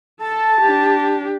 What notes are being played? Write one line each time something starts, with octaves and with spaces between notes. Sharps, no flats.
A4 A5
D4 G4